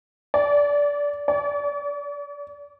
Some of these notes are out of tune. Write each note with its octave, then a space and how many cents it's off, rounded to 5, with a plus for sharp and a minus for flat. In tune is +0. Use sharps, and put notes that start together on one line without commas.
D5 -20
D5 -35